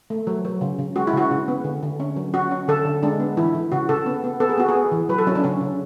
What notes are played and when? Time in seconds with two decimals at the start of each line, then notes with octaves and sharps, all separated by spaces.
0.10 A3
0.27 F#3
0.45 F#3
0.61 C#3
0.79 C#3
0.96 G#3 F#4
1.07 E4
1.13 C#3 F#4
1.31 C#3
1.48 B3
1.64 D3
1.83 D3
2.00 C#4
2.16 F#3
2.34 C#4 F#4
2.51 C#4
2.68 D3 A4
2.85 D3
3.03 G#3 D4
3.20 B3
3.37 E3 E4
3.55 E3
3.72 C#3 F#4
3.89 C#3 A4
4.06 B3
4.24 B3
4.40 B3 A4
4.49 G#4
4.58 B3 F#4
4.69 G#4
4.75 B3
4.92 E3
5.09 F#3 B4
5.18 A4
5.27 F#3 C#4
5.35 D4
5.44 C#3 C#4
5.61 C#3